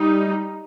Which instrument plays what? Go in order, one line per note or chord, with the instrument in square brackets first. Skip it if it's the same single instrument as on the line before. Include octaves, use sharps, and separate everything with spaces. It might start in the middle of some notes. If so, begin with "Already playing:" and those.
Already playing: [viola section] G3 D#4